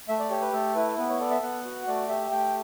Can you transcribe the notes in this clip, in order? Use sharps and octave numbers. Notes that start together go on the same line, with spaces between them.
A3 E5
D5
G4 C#5
B4
A3 A4
E4 B4
B3 B4
C#5
A4 D5
E5
B3 F#5
F#4
A3 D5
G4 E5
A3 G5